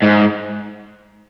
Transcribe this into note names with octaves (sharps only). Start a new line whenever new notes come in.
G#2